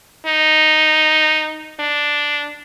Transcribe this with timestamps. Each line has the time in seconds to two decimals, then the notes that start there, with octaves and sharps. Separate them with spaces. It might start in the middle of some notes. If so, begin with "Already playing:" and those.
0.27 D#4
1.80 D4